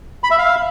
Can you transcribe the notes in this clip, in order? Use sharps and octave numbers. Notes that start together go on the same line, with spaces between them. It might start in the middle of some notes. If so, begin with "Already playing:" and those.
B5
E5
F5